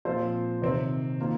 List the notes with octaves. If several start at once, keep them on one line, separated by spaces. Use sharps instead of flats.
A#2 F3 C4 F4 C5
C3 D#3 C4
D#3 A#3 F4